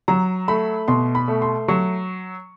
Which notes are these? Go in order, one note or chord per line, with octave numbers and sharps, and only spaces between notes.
F#3 A#5
A3 B5
B2 C6
B5
A3
C6
F#3 C#6